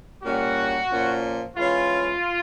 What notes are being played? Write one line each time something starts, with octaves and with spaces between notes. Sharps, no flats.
A#2 G3 A#3 C#4 F#4
A#2 F3 A#3 C#4
E3 G#3 C#4 F4